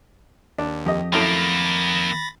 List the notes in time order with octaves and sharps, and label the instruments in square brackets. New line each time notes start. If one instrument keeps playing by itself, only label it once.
[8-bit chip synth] D#2 [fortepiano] D4
[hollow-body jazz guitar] F2 [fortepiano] G4 D#5
[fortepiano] F#2 A2 A3 [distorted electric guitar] D#3 A#3 [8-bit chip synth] B5 A6 A#6